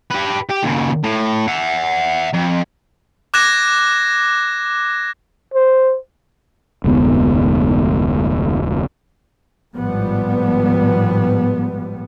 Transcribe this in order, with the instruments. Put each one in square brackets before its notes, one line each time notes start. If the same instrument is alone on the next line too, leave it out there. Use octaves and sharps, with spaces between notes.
[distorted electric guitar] G4 B4
G4
D#2 C#3
A2
E5 F#5
F2
[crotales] D6 F#6 G#6 A#6 E7
[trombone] C5
[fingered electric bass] F1 D2 G#2 B3
[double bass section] G#1 A2 F3 G3 B3